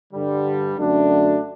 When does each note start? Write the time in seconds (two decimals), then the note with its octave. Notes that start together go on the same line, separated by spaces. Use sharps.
0.13 G2 D3 G3
0.76 F#2 D3 A3 D4 F#4